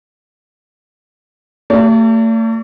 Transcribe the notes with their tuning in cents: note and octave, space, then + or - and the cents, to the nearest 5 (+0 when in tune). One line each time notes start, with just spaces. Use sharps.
A3 +40 G4 +0 D5 -35